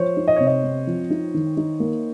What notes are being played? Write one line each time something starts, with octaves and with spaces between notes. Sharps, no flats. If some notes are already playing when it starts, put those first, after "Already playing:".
Already playing: F3 C5 C#5
D#4
D#5
C3 C#5
D#5
C4
F3
D#4
D#3
D#4
A#3